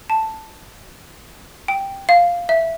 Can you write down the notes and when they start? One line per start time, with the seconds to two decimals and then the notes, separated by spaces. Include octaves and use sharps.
0.10 A5
1.68 G5
2.09 F5
2.49 E5